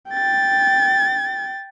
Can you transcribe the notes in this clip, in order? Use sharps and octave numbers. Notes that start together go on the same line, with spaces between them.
G5 A6